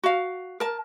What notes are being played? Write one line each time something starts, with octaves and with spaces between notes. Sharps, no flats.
F#4 F5
A#4 A5